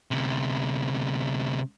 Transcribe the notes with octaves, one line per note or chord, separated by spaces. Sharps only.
D2 C3